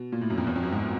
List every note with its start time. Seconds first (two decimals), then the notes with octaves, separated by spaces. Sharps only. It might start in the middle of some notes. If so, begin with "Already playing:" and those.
Already playing: B2
0.12 A#2
0.21 A2
0.30 F#2
0.38 F2
0.47 E2
0.56 F2
0.63 F#2
0.72 G#2